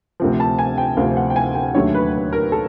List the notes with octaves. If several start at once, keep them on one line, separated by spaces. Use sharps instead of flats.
D2 C3 F3
A5
G#5
G5
D2 C3 F3 F5
F#5
G5
G#5
G5
D#2 D3 F#3 A3 C#5
B4
B4
A#4
A4